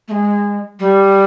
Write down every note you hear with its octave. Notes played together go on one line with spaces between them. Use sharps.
A3
G#3
G3